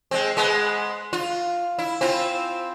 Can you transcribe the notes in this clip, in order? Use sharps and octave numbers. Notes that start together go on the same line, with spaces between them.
G#3 C4
G#3 B3
F4
E4
C4 E4 F4